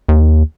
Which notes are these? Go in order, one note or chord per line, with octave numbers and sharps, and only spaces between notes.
D#2